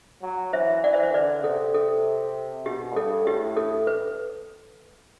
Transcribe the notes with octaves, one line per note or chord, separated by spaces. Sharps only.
F#3
E3 C5 E5
E3 D5 F#5
C5 E5
C5
D3 B4 D5
C3 A4
A4
B2 G4
G2 A4
A2 G4
A4
B4